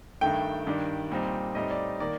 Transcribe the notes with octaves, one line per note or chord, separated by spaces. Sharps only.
G2 D#3 A3 G5
G2 D#3 G3 D4
A#2 G3 C4 D#4
A2 G3 C4 D#4 D#5
D5
D#3 A#3 D5